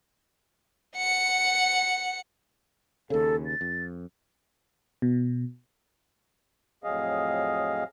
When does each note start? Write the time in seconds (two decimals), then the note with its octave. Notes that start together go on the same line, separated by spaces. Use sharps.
0.97 F#5 C#7
3.10 D#2 C#3 A4
3.46 A6
3.61 F2
5.02 B2
6.84 F2 A2 F#3 G#4 D#5 F5